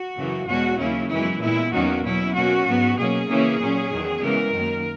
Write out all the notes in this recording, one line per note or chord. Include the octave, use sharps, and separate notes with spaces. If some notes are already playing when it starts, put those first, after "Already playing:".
Already playing: F#4
F#2 C#3 E3
E2 B2 G#3 C#4 F#4
D#2 C#3 F#3 A#3 C#4 E4
F#2 E3 G#3 B3 E4
A#2 G#3 B3 E4
E2 D#3 F#3 A#3 C#4 F#4
B2 F#3 C#4 E4
B2 A#3 C#4 F#4
G#2 F#3 B3
B2 F#3 A#3 C#4 G#4
C#3 E3 A#3 C#4
A#2 F#3 C#4
E2 D#3 F#3
C#3 E3 G#3 B3 A#4
F#2 D#3 A#3